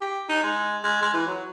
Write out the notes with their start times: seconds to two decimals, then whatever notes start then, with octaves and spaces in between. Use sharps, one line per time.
0.01 G4
0.29 D#4
0.44 G#3
0.84 G#3
1.02 G#3
1.14 E3
1.27 F#3